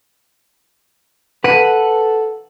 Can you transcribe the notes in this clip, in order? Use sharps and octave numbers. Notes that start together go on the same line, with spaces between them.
A4 B4 F#5 D#7